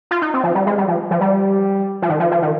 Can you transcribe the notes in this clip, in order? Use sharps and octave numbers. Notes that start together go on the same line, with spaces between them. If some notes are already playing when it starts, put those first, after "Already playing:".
F4
D#4
C4
F3
G3
G#3
G3
F3
F3
G3
F3
D#3
F3
F3
D#3